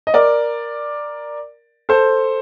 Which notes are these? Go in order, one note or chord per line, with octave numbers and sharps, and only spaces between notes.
D#5
A#4 D5
A4 C5